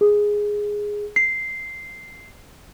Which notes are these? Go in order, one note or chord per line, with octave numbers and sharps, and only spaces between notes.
G#4
C7